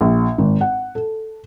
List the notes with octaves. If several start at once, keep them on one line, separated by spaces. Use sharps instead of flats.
A#1
G#1
F#5
A4